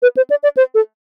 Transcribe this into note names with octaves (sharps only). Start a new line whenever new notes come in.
B4
C5
D5
D5
C5
A4